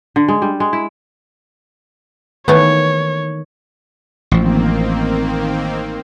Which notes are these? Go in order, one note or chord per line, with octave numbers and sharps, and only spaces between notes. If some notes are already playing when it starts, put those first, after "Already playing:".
D3
G#3
G3
G#3
E4
D#3 E3 A3 B3 C#5
A1 D#3 F3 A#3 C4